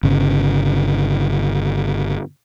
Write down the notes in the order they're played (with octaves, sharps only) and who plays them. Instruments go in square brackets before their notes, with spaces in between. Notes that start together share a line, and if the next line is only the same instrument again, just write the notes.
[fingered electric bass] G1 C#3